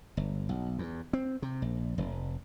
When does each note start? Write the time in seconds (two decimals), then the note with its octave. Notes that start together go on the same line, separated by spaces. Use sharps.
0.17 G1
0.49 B1
0.79 E2
1.13 C4
1.42 C3
1.62 A#1
1.98 F1